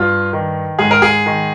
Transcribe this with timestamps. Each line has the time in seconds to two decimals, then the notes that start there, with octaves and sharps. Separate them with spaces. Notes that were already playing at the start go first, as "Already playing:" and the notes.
Already playing: G2 F4
0.33 D#3
0.79 G#2 G#4
0.91 A#4
1.02 G#4
1.26 D#3